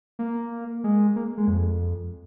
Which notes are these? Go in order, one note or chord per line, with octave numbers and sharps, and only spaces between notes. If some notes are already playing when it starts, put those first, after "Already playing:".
A#3
G#3
A#3
G#3
F2